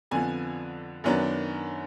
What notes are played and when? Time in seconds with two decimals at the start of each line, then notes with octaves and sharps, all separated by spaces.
0.11 F2 D3 F3 B3 G#5
1.04 F#2 D#3 F#3 B3 D4